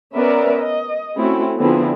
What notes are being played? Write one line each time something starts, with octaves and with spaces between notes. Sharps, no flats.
B3 C#4 A#4 B4 D5 E5
D#5
A3 C4 C#4 E4 F#4
D3 F3 B3 C4 E4 G#4